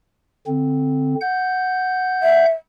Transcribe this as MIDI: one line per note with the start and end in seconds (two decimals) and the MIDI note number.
0.47 1.15 50
0.47 1.15 60
1.21 2.46 78
1.21 2.46 91
2.22 2.49 76